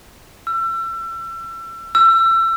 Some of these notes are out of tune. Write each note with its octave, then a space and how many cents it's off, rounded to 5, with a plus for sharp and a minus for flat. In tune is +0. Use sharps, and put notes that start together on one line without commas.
E6 +35
E6 +30